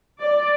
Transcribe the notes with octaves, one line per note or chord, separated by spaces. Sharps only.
D5